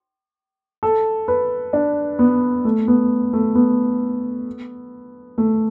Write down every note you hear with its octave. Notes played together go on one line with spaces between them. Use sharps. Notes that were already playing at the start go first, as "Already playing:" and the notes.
A4
B4
D4
B3
A3
B3
A3
B3
A3